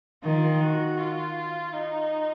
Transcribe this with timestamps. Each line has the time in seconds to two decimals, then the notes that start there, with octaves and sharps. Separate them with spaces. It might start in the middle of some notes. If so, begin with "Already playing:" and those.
0.24 D#3 F4
0.61 F#4
0.98 F4
1.74 D#4